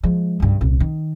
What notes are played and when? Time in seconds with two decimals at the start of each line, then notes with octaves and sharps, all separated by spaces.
0.03 F3 G#3
0.40 C#2 G2
0.61 D#1 C2
0.80 D#3